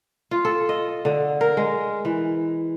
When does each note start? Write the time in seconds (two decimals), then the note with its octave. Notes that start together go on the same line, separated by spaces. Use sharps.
0.31 F4
0.45 A4
0.69 D#5
1.05 D3
1.41 A#4
1.57 G#3
2.05 E3